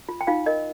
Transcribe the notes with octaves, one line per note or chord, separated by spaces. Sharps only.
F4
G5
D#4 F4 F5
A#4 D#5